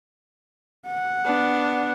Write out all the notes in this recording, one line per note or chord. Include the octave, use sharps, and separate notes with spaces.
F#5
B3 D4